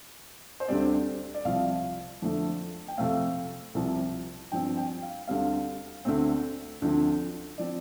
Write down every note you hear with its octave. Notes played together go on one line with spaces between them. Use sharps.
C5
D2 D3 G3 C4 D5
D5
C2 C3 F3 F5
F2 D3 F3 A3
G5
F2 C3 A3 C4 F5
C2 C3 F3
G2 F3 C4 G5
G5
F5
D2 D3 G3 C4 F5
D2 D3 A3 C4
D2 D3 F3 C4
F3 C4 D5